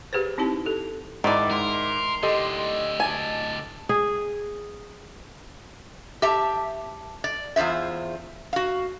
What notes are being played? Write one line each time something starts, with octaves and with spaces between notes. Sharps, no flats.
G4 G#4 B4 C5
C4 D#4 E4 G4 A5
G4 A4
G#2 D#3 E4 D5 A5
G#2 A#4 C6
A2 D3 G4 A4 D#5
G#5 A5
G#4
G4 E5 A5
D5
E2 F4 G#4 C5 E5
F#4 F5